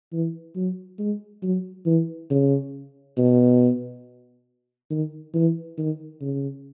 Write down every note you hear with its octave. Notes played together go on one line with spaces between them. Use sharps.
E3
F#3
G#3
F#3
E3
C#3
B2
D#3
E3
D#3
C#3